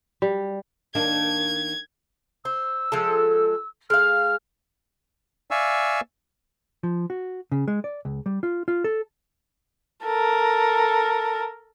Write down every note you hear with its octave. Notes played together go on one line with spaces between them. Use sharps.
G3
D#3 A#3 D4 G#6
C5 E6
F3 G#3 A4
G#3 F5 F6
D5 E5 F5 G#5 C#6 E6
F3
F#4
C#3
G#3
D5
C#2
G3
F4
F4
A4
A4 A#4